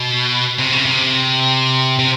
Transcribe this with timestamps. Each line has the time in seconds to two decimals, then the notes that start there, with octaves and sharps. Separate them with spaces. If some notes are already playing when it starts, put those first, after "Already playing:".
Already playing: B2
0.59 C3
0.72 C#3
0.86 C3
1.99 C3